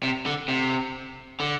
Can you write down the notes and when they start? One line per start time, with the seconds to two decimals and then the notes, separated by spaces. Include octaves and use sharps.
0.03 C3
0.26 D3
0.48 C3
1.40 D3